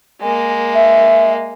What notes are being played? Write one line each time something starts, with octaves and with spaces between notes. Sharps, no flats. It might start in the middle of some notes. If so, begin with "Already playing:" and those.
G#3 A#3
E5